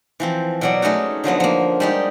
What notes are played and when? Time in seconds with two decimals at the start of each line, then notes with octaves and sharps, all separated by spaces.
0.20 E3 F3 C4
0.61 B2 F#3 D5
0.82 G#3 A3 C#4 D#4 F#4
1.24 D3 F3 F#3 B3
1.40 F3 A#3
1.80 G3 G#3 D#4